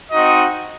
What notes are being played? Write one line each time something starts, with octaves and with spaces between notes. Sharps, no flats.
C4 D#4 F#4 D#5